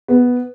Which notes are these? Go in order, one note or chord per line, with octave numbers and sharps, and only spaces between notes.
B3